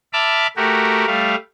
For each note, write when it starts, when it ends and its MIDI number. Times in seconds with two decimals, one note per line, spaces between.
0.13 0.47 76
0.13 0.47 81
0.13 0.47 83
0.13 0.47 86
0.13 0.47 89
0.57 1.06 57
0.57 1.06 66
0.57 1.06 67
0.57 1.06 70
1.06 1.35 55
1.06 1.35 57
1.06 1.35 77